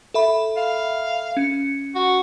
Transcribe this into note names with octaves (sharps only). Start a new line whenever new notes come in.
A4 E5 B5
F5
C#4 C#7
F#4